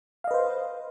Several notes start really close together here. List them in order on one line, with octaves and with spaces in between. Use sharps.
F5 D#5 B4 C5